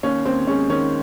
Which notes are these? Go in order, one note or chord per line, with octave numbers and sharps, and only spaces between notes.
D#2 C#4
D#2 C4
G#3 C#4
D#3 C#4